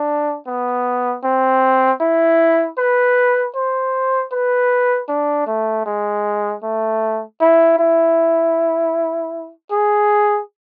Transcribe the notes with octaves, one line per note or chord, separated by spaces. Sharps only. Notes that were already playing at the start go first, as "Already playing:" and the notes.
Already playing: D4
B3
C4
E4
B4
C5
B4
D4
A3
G#3
A3
E4
E4
G#4